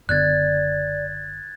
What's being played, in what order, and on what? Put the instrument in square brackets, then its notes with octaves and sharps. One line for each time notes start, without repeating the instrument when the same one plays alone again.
[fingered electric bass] F#1 D3 B3 [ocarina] D5 [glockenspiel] F#6 G#6 A6